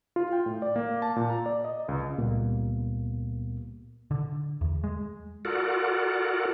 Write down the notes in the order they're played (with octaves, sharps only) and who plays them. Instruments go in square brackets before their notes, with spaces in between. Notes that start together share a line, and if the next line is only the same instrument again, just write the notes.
[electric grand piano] F4
G5
A2
D5
A#3
A5
A#2
A#5
D5
D#5
C#2
[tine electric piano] C#2 A#2 G3 A#3 B3
[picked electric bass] D3
E2
G#3
[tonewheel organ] F4 F#4 A4 A#4 D5 F#5